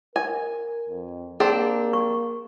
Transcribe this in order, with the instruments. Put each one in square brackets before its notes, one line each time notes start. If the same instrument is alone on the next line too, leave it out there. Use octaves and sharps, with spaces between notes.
[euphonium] A#4 [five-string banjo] G#5
[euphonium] F2
[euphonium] A#3 [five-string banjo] C4 D4 G4 [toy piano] G#4
[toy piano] C#6